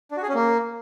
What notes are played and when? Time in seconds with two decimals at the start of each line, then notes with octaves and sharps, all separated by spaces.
0.11 D4
0.17 F#4
0.23 G#4
0.29 C#4
0.35 A#3